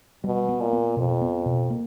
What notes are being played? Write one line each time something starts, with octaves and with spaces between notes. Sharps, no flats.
B2 G3
B3
A#2
B3
F2 B2
B3
B2
A#3